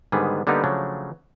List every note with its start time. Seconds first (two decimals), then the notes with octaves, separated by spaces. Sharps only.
0.12 G#2 D3 D#3 G3 B3 G#4
0.47 D3 G3 A#3 B3 D#4 G4
0.64 C#3 F3 F#3 A3 D4